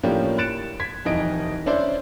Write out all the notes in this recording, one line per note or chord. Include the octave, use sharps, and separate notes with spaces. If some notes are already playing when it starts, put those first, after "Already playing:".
A2 F3 A#3 C#4 D4 G4
F#6 A6 C#7 D7 E7
G#6 B6
D#1 F2 D#3 E3 D#5 D7
C#4 D4 E4 C5 D5